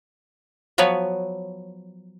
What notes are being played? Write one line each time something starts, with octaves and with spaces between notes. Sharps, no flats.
F3 F#3 B3 B4 C#5